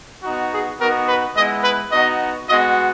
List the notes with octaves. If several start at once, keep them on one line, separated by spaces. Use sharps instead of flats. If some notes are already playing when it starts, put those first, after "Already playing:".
B3 D#4 F#4
G#4
B3 D#4 F#4 A#4
B4
G#3 B3 E4 D#5
B4
B3 D#4 F#4 D#5
G#3 B3 F#4 D#5